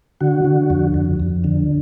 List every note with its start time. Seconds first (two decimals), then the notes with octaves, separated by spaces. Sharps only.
0.21 D3 F#4
0.45 D3
0.70 F2
0.94 F2
1.20 F2
1.44 D3